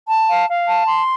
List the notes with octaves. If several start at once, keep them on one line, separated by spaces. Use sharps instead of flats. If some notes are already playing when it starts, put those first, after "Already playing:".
A5
F5
F5
A5
C6